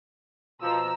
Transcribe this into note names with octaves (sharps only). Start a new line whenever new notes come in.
B2 F3 A#5 E6